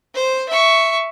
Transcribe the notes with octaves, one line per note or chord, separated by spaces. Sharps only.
C5
E5 C#6